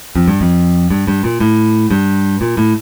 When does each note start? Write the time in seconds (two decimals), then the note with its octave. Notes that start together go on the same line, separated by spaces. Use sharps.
0.15 F2
0.28 G2
0.41 F2
0.90 G2
1.07 G2
1.24 A#2
1.40 A2
1.91 G2
2.41 A#2
2.57 A2